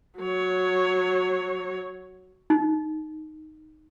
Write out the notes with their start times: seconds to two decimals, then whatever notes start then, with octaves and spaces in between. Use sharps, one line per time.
0.20 F#3 C#5
2.50 D#4